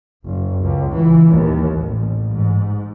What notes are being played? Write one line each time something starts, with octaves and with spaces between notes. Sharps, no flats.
F#1
C#2
E3
D#2
A1
G#2